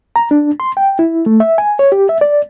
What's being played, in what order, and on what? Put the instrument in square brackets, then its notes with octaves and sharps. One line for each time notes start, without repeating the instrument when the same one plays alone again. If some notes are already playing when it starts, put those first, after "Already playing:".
[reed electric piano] A#5
D4
C6
G5
E4
A3
E5
G#5
C#5
G4
E5
D5